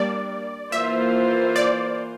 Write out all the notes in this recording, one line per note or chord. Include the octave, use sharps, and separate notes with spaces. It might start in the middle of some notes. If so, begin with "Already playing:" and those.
Already playing: G3 A#3 D4 D5
E3 A#3 F4 C5 E5
D5